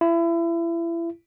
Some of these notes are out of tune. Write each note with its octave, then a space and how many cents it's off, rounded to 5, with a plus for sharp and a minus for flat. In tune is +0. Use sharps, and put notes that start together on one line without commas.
E4 +30